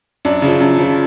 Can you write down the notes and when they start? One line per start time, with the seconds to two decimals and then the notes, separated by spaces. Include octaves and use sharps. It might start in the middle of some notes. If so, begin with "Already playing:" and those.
0.25 F#2 D4
0.42 C#3 F3
0.60 F#2
0.79 C#3 F3